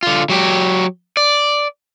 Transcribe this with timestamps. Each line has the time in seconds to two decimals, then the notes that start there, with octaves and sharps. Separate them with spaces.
0.03 D3 F4
0.30 F#3 G4
1.17 D5